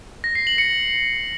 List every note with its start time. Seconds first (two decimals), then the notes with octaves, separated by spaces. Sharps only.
0.24 A#6
0.35 C7
0.47 F#7
0.58 C#7